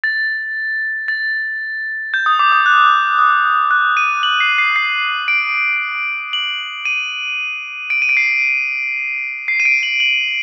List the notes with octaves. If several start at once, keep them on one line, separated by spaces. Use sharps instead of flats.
A6
A6
G6
D#6
D6
D#6
F#6
D#6
F#6
D#7
F#7
C7
C7
C7
D7
F#7
D#7
D7
D#7
D7
C7
C7
D#7
D7
F#7
F#7